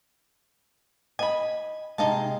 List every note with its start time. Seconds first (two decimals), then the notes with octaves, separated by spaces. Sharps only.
1.19 D#5 G#5 B5
1.98 C3 G#3 D#4 F5 A5